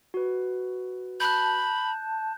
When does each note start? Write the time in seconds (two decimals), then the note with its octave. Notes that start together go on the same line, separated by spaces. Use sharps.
0.14 F#4 B4
1.20 A5 B5 F#6 G6